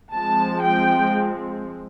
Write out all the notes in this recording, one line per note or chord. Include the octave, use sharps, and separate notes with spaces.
F3 G#3 C4 A5
G5